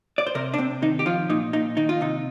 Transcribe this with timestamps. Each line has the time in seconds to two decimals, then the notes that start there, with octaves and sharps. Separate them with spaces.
0.18 D5
0.27 C5
0.35 C3 A#4
0.54 D4
0.58 C3 C4
0.82 D#3 D#4
0.99 G4
1.06 F3 F4
1.30 A#2 D#4
1.53 A#2 D#4
1.77 D#3 D#4
1.89 F4
2.01 C3 D#4